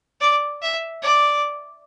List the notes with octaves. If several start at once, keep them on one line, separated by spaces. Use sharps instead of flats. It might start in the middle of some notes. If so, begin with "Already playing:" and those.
D5
E5
D5